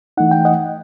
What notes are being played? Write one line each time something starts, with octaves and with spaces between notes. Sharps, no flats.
E3 A3 D#4 F#5
G5
D#5 F#5